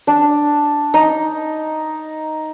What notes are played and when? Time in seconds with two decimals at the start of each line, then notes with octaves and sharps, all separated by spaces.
0.07 D4
0.94 D#4